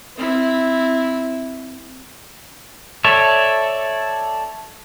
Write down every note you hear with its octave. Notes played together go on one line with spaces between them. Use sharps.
C4 E4
A4 C#5 D5 E5